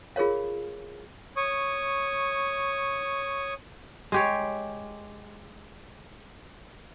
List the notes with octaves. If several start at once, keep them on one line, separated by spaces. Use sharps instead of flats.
F4 G#4 A#4 C#5 F5
C#5 C#6 D#6
G#3 G4 C#5